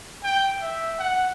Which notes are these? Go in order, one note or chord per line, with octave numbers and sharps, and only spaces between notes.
G5
E5
F#5